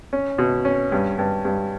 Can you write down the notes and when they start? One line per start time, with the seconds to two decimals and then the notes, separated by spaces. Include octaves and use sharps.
0.13 C#4
0.38 B2
0.65 C#4
0.92 G2
1.18 G2
1.45 G2